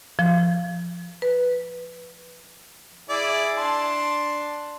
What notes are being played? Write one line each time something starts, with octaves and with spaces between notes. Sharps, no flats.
F3
B4
E4 G#4 D5
D4 A5 C6